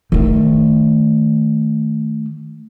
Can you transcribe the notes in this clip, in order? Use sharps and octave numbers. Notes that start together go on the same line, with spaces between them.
D#3 A3